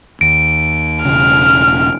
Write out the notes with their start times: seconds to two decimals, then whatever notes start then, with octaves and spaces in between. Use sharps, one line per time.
0.21 D#2 D7
1.05 E1 C#3 F6